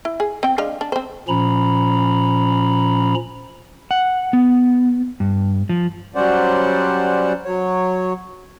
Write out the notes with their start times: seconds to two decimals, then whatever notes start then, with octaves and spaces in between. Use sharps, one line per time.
0.05 E4
0.20 G#4
0.43 C4 G5
0.58 G#3 D4 F5
0.81 D4
0.92 C4 C5
1.28 A#2 F3 C#4 A#5 B5
3.91 F#5
4.33 B3
5.20 G2
5.69 F3
6.15 F#3 G3 C#4 C5 D5 F#5
7.45 F#3 C#5